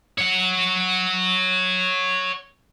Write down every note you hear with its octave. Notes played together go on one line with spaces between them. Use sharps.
C#5 F#5